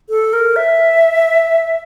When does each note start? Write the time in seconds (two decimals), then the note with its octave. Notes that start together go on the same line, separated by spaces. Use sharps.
0.09 A4
0.33 A#4
0.56 E5